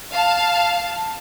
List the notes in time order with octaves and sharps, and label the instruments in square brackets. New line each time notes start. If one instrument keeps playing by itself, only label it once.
[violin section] F5 A5